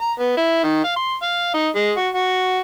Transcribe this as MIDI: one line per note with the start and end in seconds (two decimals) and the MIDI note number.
0.01 0.12 82
0.19 0.35 59
0.37 0.62 64
0.64 0.82 51
0.84 0.93 77
0.96 1.14 84
1.22 1.54 77
1.54 1.67 63
1.75 1.91 56
1.97 2.09 66
2.14 2.59 66